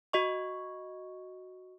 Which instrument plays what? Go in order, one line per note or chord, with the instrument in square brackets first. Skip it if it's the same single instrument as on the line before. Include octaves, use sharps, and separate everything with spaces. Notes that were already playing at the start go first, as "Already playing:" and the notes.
[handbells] F#4 D#5 C#6